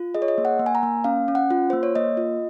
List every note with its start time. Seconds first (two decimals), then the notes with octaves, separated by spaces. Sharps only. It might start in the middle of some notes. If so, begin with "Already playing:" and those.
Already playing: F4
0.15 G#4 D#5
0.22 C#5
0.28 D#5
0.38 A#3
0.45 F#5
0.59 A#3
0.66 G#5
0.75 A#5
0.83 A#3
1.04 C#4 F5
1.28 C#4
1.35 F#5
1.51 F4
1.70 A#3 C5
1.83 C#5
1.95 A#3 D#5
2.17 F4